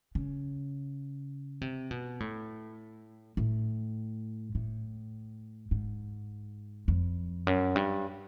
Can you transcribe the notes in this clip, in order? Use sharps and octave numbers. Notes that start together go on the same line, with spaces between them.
C#3
C3
B2
A2
A2
A2
G#2
F2
F#2
G2